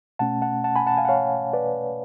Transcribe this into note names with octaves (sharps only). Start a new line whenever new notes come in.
B2 A3 C#4 F#5 A5
F#5 A5
F#5 A5
G#5 B5
F#5 A5
F5 G#5
F#5
C#5 F5
B4 D5